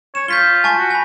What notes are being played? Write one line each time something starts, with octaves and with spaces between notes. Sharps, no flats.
C#5 E7
F4 G6 B6 G7
G#5 A5 C#6
F#4
G#5 B5